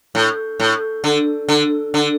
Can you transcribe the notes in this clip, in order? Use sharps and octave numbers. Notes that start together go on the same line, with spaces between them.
A2
A2
D3
D3
D3